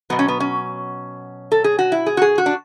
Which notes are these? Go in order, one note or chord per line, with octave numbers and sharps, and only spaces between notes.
B2 F#3 B3
C#4
B3
C#4
A4
G#4
F#4
E4
G#4
F#4
G#4
F#4
D4